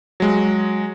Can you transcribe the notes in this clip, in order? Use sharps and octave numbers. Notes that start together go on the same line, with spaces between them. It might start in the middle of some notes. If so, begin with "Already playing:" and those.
F#3 G#3